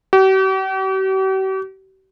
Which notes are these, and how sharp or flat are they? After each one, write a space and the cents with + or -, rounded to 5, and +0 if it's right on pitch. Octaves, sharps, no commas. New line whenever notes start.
G4 -45